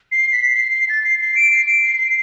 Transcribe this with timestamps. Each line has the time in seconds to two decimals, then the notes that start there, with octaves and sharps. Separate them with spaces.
0.12 C7
0.33 B6
0.53 C7
0.74 C7
0.89 A6
1.04 C7
1.21 C7
1.36 D7
1.51 C7
1.67 D7
1.82 C7
1.98 C7